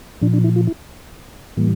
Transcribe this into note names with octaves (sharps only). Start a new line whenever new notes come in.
A#2 F3 D4
D4
E4
F4
E4
A2 E3 G3 A#3